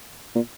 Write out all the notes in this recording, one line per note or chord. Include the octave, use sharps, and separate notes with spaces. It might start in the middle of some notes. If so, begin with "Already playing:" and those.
A#2